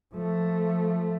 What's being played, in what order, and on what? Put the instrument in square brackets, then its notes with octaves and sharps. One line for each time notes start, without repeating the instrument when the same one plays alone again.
[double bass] F3 A3